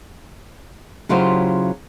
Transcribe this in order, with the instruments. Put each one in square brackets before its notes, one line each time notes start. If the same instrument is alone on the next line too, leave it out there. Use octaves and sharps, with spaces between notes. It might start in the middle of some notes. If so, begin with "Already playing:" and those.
[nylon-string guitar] C#3 F#3 E4 F4 G4 C5